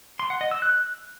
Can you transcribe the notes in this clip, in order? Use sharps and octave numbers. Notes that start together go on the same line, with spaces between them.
C6
F#5
D#5
E6
F#6